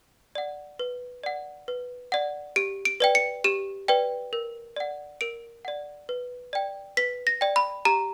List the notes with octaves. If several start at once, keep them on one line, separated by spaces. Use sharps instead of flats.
D5 F#5
B4
D5 F#5
B4
D5 F#5
G4 D7
D7
B4 D5 G5
C#7
G4 E7
B4 D5 G5
A#4
D5 F#5
A#4 D7
D5 F#5
B4
D5 G5
B4 B6
A#6
D5 G5
B5
G4 A#5